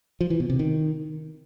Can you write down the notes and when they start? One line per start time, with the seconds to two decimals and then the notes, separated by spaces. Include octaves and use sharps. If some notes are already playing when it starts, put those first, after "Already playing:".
0.21 F3
0.30 E3
0.40 B2
0.50 C3
0.59 D#3